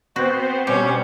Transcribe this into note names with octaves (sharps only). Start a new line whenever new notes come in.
B3 C4 F#4 C5
B2 G3 C#4 G4